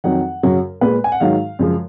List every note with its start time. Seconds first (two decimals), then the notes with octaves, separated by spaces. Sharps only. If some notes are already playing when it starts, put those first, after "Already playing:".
0.04 F2 D#3 F#3 F#5
0.43 F#2 C#3 F#3
0.81 A#2 G#3 B4
1.04 G#5
1.12 F#5
1.20 G#2 D#3 F#3 F5
1.59 F#2 C#3 F3 G#3